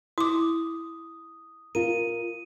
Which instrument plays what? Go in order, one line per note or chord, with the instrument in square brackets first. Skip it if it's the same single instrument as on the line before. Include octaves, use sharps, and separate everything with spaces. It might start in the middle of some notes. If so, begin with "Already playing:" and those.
[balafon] E4 D6 [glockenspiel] D#6
[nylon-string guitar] F4 A#4 [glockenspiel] D#7